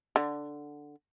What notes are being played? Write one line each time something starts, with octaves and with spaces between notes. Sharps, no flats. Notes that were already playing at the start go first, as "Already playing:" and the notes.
D3